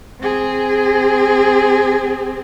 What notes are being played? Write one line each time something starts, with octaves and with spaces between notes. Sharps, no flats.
C4 G#4